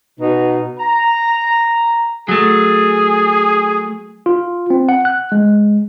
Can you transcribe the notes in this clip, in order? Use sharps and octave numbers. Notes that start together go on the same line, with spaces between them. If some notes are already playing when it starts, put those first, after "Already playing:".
B2 D#4
A#5
F#3 A3 G#4
F4
C4
F#5
F#6
G#3